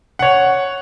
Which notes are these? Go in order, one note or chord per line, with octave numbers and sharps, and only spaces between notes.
C#5 F#5